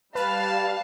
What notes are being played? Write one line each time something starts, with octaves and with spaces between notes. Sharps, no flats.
G3 B4 F5 A5